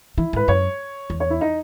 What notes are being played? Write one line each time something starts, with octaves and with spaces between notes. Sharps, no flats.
E3 E4
G#2
B4
F#2 C#5
E2
C#5
E4
D#4